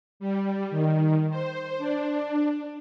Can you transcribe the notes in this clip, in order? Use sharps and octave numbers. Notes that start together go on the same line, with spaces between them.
G3
D#3
C5
D4